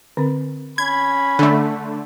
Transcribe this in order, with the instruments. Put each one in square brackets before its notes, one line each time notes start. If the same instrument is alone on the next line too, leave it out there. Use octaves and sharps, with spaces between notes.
[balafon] D3 C4 A#4
[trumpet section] C#4 B5 [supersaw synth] G#6
[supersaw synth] D3 A3 [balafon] D4